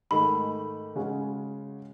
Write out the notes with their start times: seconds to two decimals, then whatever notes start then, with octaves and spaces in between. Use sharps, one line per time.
0.11 G#2 D#3 A3 B5
0.95 C#3 G#3 C#4 F#4